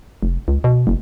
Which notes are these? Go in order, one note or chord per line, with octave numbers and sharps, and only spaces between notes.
F1
C#2
B2
F#1